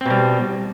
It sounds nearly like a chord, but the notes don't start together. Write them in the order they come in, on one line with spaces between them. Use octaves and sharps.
C4 B2 G3